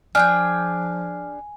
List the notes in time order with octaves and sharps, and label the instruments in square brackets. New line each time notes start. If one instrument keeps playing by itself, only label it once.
[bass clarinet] F3 [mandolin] D4 G#4 G5 [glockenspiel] G#5 [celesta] F6